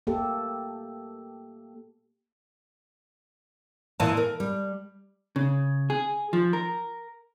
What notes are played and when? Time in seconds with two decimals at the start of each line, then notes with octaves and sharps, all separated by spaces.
0.07 A#3 G4 A4
4.00 A#2 E3 D#5 A5
4.17 A#4
4.40 G3
5.36 C#3
5.90 G#4
6.33 F3
6.53 A#4